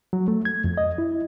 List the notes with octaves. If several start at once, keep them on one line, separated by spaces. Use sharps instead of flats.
F#3
A3
G#6
F2
D#5
E4